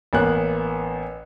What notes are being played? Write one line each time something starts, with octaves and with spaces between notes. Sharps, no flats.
A1 A#3 B3 C#5 F#6